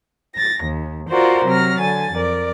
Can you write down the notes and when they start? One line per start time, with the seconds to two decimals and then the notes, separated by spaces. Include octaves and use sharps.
0.34 A6 A#6
0.64 D#2
1.10 F4 F#4 A#4 C5 D5 F#5
1.45 C3 F#3 F6 A#6
1.78 D3 G#5 A6
2.13 F2 A#4 D5